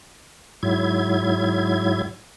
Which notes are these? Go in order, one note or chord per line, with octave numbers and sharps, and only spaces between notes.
G#2 F#3 E4 G#6